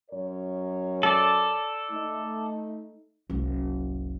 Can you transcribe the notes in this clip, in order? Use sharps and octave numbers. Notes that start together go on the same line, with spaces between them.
F#2 A#4 C#5
A4 D5
A3 D#4
F#1 C2